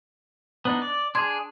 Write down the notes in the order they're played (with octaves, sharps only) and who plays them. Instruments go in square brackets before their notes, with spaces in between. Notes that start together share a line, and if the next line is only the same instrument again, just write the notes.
[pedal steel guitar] B3 D4 D#4
D5
[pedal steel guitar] D4 G#4 [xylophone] C6 G#6